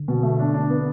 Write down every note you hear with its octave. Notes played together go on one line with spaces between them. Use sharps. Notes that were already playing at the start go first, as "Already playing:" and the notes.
Already playing: D3
B2
A3
D4
D4
B3